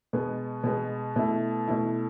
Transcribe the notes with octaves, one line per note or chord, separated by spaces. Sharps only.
B2 G#3 B3
B2 G#3 B3
B2 A3 E4
B2 A3 E4